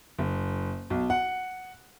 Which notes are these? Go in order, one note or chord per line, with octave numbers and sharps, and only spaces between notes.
F#1
B1
F#5